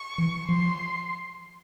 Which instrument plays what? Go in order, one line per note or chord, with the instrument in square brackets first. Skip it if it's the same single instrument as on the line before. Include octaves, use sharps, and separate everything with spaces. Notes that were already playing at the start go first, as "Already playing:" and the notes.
Already playing: [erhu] C#6
[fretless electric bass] E3
[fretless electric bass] F3 [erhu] C6